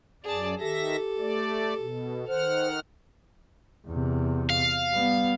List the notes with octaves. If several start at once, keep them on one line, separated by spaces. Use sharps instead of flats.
F#2 G#4 D5 A5
D#3 G4 A4 E5 A#6
A3 D5
B2
D#3 C5 F#5 F6
E2 C3
F5
G3 B3